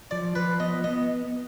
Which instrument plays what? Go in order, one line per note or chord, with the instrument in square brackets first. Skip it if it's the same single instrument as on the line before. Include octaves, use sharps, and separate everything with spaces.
[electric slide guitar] F3 [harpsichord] D5
[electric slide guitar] F3 [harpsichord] B4
[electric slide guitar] B3 [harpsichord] D#5
[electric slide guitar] B3 [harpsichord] D#5